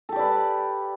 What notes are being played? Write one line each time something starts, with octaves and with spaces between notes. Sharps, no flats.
G4 A4 B4 D5